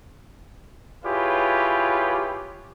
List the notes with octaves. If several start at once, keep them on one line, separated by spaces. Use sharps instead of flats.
E4 F4 G4 G#4 B4 C#5